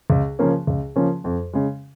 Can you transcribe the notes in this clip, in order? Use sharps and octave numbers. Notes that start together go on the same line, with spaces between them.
C#2
C#3 F3 A#3 C#4
C#2
C#3 F3 A#3 C#4
F2
C#3 G#3